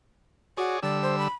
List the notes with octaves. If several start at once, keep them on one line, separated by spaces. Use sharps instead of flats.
F#4 G#4 C#5 D5
D3 G3 D5 E6
C5
B5